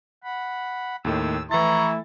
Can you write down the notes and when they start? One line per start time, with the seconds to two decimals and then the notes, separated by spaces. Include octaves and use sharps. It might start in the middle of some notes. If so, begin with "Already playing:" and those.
0.23 F#5 B5
1.05 D#2 A2 D#3 E6
1.51 E3 A3 E4 A#5 C#6 A6